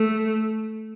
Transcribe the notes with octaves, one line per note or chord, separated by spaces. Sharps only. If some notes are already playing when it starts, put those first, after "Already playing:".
Already playing: A3